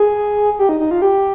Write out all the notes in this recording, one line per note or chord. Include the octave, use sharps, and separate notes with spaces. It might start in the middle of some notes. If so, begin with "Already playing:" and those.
Already playing: G#4
G4
D#4
D#4
F4
G4